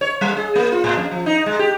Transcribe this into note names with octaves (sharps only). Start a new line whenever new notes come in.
C#5
G3
G#4
A#3
F4
A2
F2
F3
D#4
G#3
G4